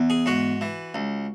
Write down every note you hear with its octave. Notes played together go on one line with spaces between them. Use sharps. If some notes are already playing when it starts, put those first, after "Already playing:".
Already playing: E2
G#4
G#2 F#4
E3
C#2